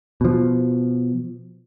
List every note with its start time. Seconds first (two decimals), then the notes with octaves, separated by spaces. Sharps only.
0.21 B2 F3